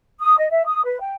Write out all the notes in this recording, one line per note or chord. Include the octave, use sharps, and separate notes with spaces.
D#6
D#5
E5
D#6
B4
G5